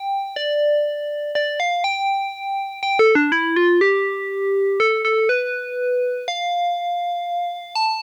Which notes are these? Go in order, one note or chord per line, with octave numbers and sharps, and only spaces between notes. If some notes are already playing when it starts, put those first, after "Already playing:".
Already playing: G5
D5
D5
F5
G5
G5
A4
D4
E4
F4
G4
A4
A4
B4
F5
A5